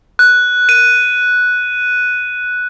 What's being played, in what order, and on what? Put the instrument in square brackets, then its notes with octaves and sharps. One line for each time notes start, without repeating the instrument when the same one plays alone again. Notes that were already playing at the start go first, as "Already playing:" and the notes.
[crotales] F#6
D#7